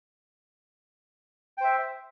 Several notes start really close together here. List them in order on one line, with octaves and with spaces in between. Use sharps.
G5 C5 E5